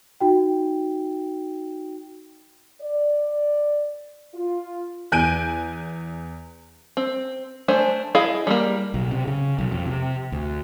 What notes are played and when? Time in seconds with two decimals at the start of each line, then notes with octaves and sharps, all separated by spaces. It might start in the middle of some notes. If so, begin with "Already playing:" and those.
0.20 D#4 F#4 G5
2.81 D5
4.34 F4
5.12 E2 G#5 F#6 G6 D7 D#7
6.97 C4
7.68 A3 D4 C5 G#5
8.15 E4 G#4 D#5 F5
8.47 G3 A3 A#3
8.94 B1
9.11 C3
9.27 C#3
9.59 B1
9.72 F2
9.86 C3
10.32 D2